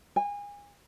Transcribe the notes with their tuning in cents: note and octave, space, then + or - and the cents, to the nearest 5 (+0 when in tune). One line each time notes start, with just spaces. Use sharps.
G#5 -30